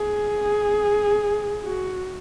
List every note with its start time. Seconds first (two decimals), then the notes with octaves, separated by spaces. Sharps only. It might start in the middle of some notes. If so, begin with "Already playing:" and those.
Already playing: G#4
1.64 F#4